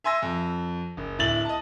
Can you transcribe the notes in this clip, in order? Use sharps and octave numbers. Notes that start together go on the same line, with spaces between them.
E5 G#5 C6 E6 A#6
F2
F#1
D1 E4 A6 F#7
D#5 A5